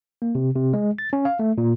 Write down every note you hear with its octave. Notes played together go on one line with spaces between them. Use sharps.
A#3
C3
C3
G#3
A6
C#4
F5
A3
A#2